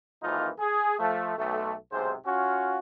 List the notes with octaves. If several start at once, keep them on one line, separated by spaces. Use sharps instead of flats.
G#1 F2 E3 A#3 D#4 F4
G#4
F3 A3
B1 A3
B1 G#2 C3 G#4 C5
C#4 F4 F#4